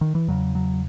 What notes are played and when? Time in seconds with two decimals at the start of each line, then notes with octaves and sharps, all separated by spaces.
0.01 D#3
0.15 E3
0.28 E2 C#3 F#3
0.55 F#3